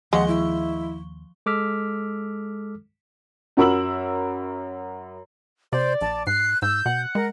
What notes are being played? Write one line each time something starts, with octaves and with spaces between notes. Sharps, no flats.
D#2 F3 G#3 F#5 C#6 G7
E4
G#3 A4 D6 E6 F6 B6
F#2 F#4 A#4 B5 E6 F#7
C3 C5 D5
A#1 A5
G#2 F#6 C7
G#2 E6 G6
B2 F#5
G#3 A#4